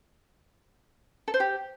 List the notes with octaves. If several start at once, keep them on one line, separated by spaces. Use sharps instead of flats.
A4
C5
G4